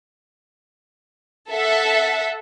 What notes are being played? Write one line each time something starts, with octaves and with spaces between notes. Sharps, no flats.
A4 E5 F#5